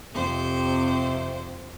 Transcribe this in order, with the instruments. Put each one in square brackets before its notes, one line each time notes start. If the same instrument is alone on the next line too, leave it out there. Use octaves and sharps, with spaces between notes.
[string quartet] F2 C5 [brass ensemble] C3